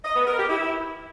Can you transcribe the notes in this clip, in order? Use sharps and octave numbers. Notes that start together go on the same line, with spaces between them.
D#5
B3
A#4
G4
E4